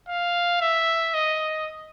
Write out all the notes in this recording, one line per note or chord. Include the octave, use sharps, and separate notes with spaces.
F5
E5
D#5